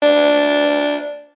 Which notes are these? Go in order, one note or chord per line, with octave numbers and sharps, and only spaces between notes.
D4